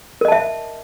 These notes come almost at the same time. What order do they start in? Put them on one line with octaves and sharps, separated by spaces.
A#4 D#5 A5 E5